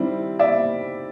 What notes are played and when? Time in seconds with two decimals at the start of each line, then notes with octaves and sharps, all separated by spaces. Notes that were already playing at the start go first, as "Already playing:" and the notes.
Already playing: D#3 G3 C4 E4
0.39 D5 E5